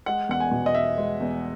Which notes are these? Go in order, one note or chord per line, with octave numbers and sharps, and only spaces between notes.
G#3 F#5
E2 F#5
G#5
B2
D#5
E2 E5
G#3
E2